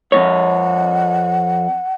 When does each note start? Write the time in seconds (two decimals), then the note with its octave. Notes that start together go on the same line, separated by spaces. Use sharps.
0.12 F2 G#2 C#5 F#5